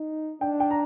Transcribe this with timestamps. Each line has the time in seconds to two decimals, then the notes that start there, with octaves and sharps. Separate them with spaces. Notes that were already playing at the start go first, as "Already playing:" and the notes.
Already playing: D#4
0.41 D4 G5
0.60 G5
0.71 A#5